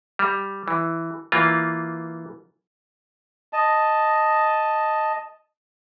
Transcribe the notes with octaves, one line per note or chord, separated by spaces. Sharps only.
G3
E3
E3 A#3 F4
D#5 A5